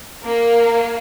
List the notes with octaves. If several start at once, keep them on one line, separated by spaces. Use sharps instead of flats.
A#3